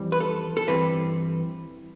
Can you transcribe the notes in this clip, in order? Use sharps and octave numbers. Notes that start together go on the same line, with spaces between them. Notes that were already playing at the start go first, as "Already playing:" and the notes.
Already playing: F2 E3 G3
B4
A4
A4
G2 E3 G3 C4 B4